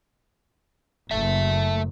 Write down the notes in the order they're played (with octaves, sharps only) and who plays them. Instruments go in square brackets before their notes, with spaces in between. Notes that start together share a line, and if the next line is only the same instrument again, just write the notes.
[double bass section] F#1 [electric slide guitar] A3 E5